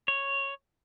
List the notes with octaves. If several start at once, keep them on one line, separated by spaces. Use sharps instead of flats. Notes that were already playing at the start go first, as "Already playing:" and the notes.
C#5